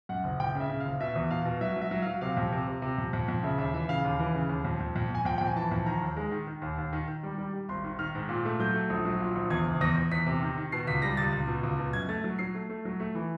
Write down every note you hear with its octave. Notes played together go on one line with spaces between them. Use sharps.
F#2 F#5
F#1
F#1 G5
C#3 E5
C#3
F5
F#1
B2 E5
E2
B2 F5
B2
F#3 E5
F#3
E5
F#3
F#3 F5
C3 F5
F2
C3
C3
C3
F2
F2
F2
C#3 E5
D#2 E5
E3 E5
C#3 F5
D#2
E3
C#3
D#2
F2
F2
F2
F2 G#5
F2 G5
F2 G5
G#5
E3 A5
F2
D#3 A#5
D#2
G#3
D#3
D#3
D#2
D#2
D#3
D#3
G3
G3
G3
G#1 C6
D#3
D#3 F6
G#2
A#2
A3
F#3 G6
A3
A#1
F#3
A#2
A#1
E2 G#6
F#1
E2 A#6
E2
E2 B6
C3
D#3
D#3
B2 C7
C#2 B6
G3 A#6
C#2 A6
C#2
B2
C#2
B2
F#2 G#6
A3 A6
F#3
F#3 C7
A3
A3
F#3
A3
E3